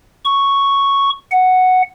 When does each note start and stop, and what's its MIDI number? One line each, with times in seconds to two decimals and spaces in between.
0.25 1.10 85
1.32 1.82 78